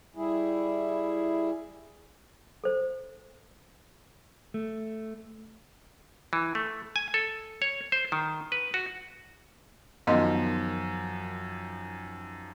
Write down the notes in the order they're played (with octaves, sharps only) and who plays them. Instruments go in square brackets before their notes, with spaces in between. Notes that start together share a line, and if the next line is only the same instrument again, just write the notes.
[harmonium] G3 E4 G#4
[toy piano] A4 C5
[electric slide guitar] A3
[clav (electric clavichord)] E3
A3
G#5
A4
C#5
C5
D#3
B4
F#4
[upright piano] F#2 D#3 F3 [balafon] B3 D#5 C6